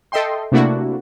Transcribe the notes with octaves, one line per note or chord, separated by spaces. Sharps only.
A4 D#5 E5 G5 C6
C3 A3 A#3 D4 E4 F#4